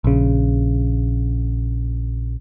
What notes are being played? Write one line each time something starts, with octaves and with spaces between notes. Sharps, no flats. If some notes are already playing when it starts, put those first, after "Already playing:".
A#1 C#3